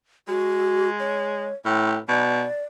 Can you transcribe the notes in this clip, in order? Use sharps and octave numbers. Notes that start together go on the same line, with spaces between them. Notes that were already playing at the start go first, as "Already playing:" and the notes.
G#3 F#4
C#5
A2 G5
B2 D5